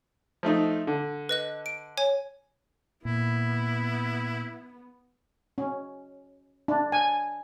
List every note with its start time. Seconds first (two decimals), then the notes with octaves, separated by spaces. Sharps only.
0.43 F3 A3 D#4
0.87 D3
1.29 B4 D#5 F#6
1.66 D7
1.97 C#5 G#5
3.05 A#2 B3 E4
5.58 C#4
6.68 D4
6.92 G#5